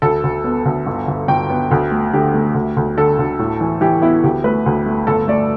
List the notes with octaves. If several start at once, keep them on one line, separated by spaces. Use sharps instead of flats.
D2 A4
D2
B3
D2
G1
G1
G1 G5
B3
D2
A3
D3 G4
A3
D2
D2
D3 A4
D2
A2
E3
E3 G4
B3 E4
D2 G4
A3 B4
D2
A3
G1 A4
A3 D5